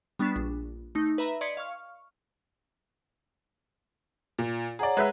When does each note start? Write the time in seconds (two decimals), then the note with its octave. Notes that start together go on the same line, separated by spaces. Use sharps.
0.19 G3 B3 D4 C#6 B6 E7
0.36 A#1
0.95 A3 D#4
1.18 B4 E5 A#5 B5
1.41 D5 D#5 C6 G#6 B6 C#7
1.57 F5 C#6 F6
4.39 A#2
4.79 G#4 C#5 D5 F#5 A#5
4.97 G#3 B4 E5